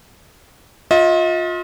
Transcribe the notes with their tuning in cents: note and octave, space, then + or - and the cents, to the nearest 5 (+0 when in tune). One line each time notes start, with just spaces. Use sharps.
F4 +25 D#5 +45